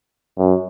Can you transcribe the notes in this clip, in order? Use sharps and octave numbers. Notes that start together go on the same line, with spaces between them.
F#2